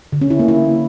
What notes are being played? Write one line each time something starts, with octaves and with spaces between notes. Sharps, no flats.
D3
C#4
E4
A#3
E4